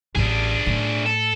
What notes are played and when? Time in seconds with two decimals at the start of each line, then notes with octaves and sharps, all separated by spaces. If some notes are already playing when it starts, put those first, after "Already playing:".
0.16 A1 D4 G#4
0.66 A2
1.06 A4